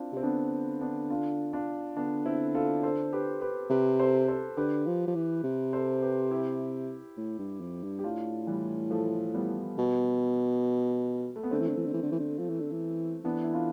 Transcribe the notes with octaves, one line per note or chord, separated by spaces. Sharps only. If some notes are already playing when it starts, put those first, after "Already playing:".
Already playing: C4 D4 E4 F4
C3 C4
D3 B3 D4
B3 D4
D4 F4
D4 F4
D3 B3 D4
C4 E4
F4 A4
A4 C5
G4 B4
G4 B4
C3 G4 B4
A4 C5
A4 C5
D3 G4 B4
F3
F3
E3
C3
A4 C5
G4 B4
E4 G4
A2
G2
F2
G2
G4
A2 D4 F4
E3 G3
F3 A3
G3 B3
B2
A3
B3
D3 A3 C4
E3
D3
E3
D3
E3
D3
E3
D3
F3
E3
D3
E3
E3 B3 D4
E4
D4 F4